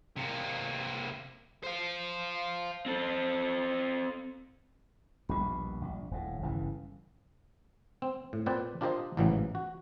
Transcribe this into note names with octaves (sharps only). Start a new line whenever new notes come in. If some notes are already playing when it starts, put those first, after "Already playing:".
C3 A#3
C5 F5
C4 A4
A#1 D#2 B2 G3 D#5 B5
A#1
D#1 A2
G1 C#3 E3
C4
A2
A#2 C4 B4 D5 G5
D4 F4 G4 A#4 C5 D#5
A1 G#2 C#3 E3 F#3 G3
F#4